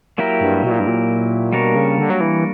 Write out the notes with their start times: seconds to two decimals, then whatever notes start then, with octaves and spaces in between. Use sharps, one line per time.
0.18 F#3 A#3 E4 G4 A#4
0.41 G2
0.63 B2
0.71 A#2
0.80 G2
0.87 A#2
1.53 B2 G3 A#3 D4 A#4 C#5
1.75 C#3
1.98 D3
2.10 F#3
2.21 E3